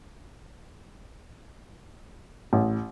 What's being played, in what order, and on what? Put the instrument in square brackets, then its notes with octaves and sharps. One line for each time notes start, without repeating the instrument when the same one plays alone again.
[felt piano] A1